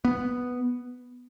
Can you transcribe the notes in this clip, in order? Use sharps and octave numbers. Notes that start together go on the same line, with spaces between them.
B3